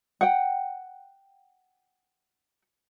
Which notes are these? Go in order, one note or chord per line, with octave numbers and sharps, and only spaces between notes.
F#5 G5